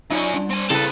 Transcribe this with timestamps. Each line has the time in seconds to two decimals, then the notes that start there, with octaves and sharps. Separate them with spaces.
0.11 F#2 C#4 D#4 F4 D5
0.34 G3 D4
0.51 C4 G#5
0.70 C#3 C4 E4 A4 B4